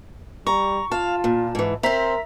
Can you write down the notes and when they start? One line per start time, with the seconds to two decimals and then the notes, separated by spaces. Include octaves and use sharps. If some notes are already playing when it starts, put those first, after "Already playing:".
0.47 G3 A#5 C#6
0.92 F4 F5 A5
1.24 A#2
1.55 G#2 E3
1.83 C4 A#4 C5 E5 A#5 B6